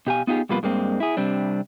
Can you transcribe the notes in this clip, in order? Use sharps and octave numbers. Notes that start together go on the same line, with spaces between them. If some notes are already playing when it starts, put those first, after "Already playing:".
B2 G4 F5 G#5
B3 D#4 F4 G4 G#4
F2 B2 G3 A#3 F4 B4
G2 G#3 A#3 C4
E4 G#4
C3 G3 C4 D4